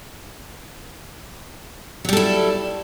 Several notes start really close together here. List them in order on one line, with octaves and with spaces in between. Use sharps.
F#3 G3 A4 E4